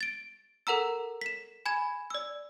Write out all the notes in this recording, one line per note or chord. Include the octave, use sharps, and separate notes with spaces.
A6 D7
A4 A#4 F#5 A#5 E6
B6 E7
G#5 B5 G#6 E7
D5 E6